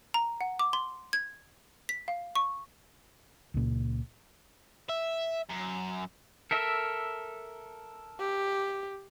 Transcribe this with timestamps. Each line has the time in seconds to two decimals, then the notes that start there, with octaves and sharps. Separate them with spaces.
0.14 A#5
0.41 F#5
0.59 D6
0.73 C6
1.13 G#6
1.89 B6
2.08 F5
2.35 C#6
3.54 C#2 A#2
4.89 E5
5.49 F#2
6.51 A4 A#4 E5
8.19 G4